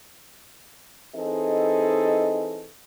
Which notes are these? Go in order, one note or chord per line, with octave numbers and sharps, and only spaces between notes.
E3 C4 D#4 G#4 A4 D#5